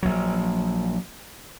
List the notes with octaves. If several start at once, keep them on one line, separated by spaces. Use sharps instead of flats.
A#1 F#3